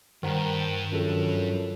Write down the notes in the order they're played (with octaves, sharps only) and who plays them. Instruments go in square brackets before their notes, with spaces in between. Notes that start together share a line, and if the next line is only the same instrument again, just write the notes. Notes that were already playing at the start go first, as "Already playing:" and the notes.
[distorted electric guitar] G2 [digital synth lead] D#3 [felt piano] C5 F#5 A#5
[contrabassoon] F#2 [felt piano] F3 A4